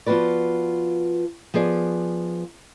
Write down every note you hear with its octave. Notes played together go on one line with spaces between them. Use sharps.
F3 B3 F4 F#4 B4 D5
F3 B3 G#4 D5